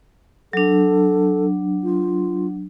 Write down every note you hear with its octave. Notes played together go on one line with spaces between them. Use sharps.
F#3 D4 A4
F4